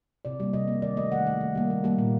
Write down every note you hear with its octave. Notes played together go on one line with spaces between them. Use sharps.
C3 D5
G3 A#3
C3 D#5
G3 A#3
D#3 D5
A3 D#5
D#3 F#5
A3
D#3
G3 A#3
D#3
G3 A#3
A#2